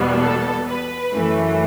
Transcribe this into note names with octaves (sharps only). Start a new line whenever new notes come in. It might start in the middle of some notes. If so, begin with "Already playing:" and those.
Already playing: E2 B2 G3 B3
A4
B4
F#2 E3 A3